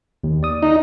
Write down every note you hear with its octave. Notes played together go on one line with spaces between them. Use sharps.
D#2
D5 D#6
D#4